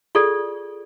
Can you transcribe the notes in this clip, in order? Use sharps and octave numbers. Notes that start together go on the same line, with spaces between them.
F4 G#4 A4 D5